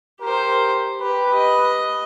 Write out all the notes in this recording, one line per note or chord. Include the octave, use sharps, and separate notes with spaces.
G4 A#4 C5
G4 B4
D#5